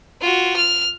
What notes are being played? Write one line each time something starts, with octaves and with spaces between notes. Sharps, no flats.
F4 F#4
F6